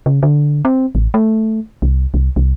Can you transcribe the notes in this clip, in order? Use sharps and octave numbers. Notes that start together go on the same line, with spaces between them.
C#3
D3
C4
A1
A3
C2
C2
C2